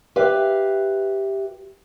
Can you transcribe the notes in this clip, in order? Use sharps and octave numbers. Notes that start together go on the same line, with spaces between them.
G4 B4 E5 F5